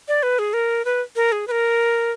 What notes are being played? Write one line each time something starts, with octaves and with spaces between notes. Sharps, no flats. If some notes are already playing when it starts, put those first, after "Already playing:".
D5
B4
G#4
A#4
B4
A#4
G#4
B4
A#4